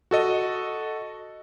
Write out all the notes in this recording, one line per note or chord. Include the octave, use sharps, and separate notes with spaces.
F#4 A4 D#5